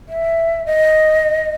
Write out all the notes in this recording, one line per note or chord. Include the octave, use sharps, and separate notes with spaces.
E5
D#5